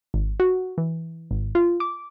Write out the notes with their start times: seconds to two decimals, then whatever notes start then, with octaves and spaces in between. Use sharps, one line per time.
0.14 G#1
0.40 F#4
0.78 E3
1.31 G#1
1.55 F4
1.80 D6